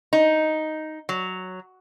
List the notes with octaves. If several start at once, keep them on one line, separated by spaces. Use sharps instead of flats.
D#4
F#3